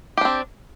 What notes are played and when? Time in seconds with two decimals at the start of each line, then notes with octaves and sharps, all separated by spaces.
0.17 G4
0.21 D4
0.25 C4